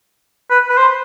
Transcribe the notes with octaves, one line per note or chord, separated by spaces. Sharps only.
B4
B4
C5